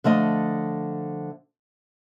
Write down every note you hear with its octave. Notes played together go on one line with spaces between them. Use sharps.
D3 F3 A3 D#5